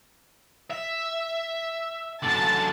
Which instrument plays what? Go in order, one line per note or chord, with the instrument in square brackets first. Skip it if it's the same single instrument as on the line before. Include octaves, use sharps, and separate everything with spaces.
[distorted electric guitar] E5
[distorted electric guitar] F#2 D3 [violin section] A5